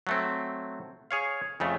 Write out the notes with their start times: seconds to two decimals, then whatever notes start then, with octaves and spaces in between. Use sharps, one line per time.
0.07 F#3 A3 C4
1.11 G#4 C#5 F5
1.60 F2 C#3 A3